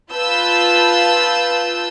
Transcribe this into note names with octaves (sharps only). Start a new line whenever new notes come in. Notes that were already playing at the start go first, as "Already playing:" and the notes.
F4 B4 A5 E6 G6